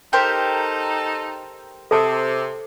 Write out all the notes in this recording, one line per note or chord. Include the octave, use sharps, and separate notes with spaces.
D#4 G4 A4 A#4 C5
C3 A4 A5